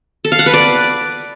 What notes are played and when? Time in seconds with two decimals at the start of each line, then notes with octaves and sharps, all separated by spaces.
0.25 A4
0.32 F5
0.39 F#5
0.46 B4
0.53 D5